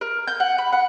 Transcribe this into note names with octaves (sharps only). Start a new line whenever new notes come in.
A#4
G6
F#5
B5
F#5